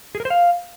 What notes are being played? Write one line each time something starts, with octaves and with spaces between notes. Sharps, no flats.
G#4
A#4
C5
F5